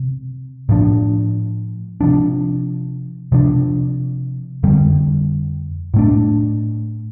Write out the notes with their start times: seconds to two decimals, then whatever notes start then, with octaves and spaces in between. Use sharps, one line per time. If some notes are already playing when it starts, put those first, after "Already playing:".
Already playing: C3
0.69 A2 F3 D4
2.01 C3 F3 D4
3.32 C3 F3 D4
4.63 F2 D3 G3
5.94 A2 A3 D4